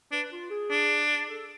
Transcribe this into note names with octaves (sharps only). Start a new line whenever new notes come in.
D4 B4
F4
G#4
D4
A4